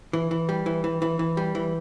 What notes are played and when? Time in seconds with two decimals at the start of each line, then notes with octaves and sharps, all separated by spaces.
0.13 E3
0.31 E3
0.49 G3
0.66 E3
0.84 E3
1.02 E3
1.19 E3
1.37 G3
1.55 E3